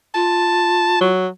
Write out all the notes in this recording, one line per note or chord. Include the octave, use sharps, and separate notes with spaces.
F4 A5
F#3